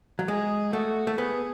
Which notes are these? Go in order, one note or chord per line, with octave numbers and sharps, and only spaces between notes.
F#3
G#3 G#4
A3 F#4
A3
B3 G#4